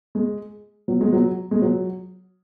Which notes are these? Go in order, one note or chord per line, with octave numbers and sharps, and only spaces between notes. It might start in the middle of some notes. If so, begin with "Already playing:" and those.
G#3
F#3
G#3
F#3
G#3
F#3